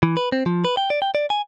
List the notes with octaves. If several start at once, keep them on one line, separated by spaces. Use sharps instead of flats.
E3
B4
C4
F3
B4
G5
D5
G5
D5
G#5